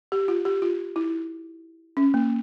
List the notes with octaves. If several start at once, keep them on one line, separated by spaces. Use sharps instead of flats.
G4
F4
G4
F4
E4
C#4
A#3